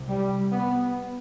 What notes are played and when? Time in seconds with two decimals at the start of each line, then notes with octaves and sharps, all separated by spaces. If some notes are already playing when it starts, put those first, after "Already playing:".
Already playing: C2 C3
0.09 G3
0.52 B3